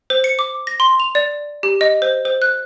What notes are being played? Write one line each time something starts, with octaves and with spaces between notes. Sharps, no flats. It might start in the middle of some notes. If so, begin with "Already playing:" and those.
C5
C#7
D6
A#6
C6
F7
D5
G4
D#5
C5
C5
F#6